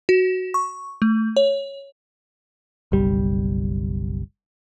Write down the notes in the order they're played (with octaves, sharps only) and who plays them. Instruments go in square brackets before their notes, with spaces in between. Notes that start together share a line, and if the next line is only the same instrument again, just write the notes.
[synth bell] F#4
C#6
A3
C#5
[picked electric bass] F#1 B1 G3